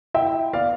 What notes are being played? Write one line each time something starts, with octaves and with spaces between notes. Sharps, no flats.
E4 E5 G5
B3 D5 F5